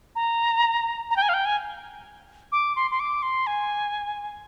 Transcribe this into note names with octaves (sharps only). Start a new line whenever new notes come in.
A#5
A#5
G5
G#5
F5
G5
G#5
D6
C6
C6
D6
C6
G#5